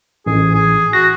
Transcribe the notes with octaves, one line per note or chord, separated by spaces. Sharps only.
A1 G#4
G#4
F#4 A#6